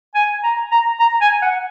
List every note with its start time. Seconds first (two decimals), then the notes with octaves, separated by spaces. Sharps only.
0.15 G#5
0.43 A#5
0.71 A#5
0.99 A#5
1.21 G#5
1.42 F#5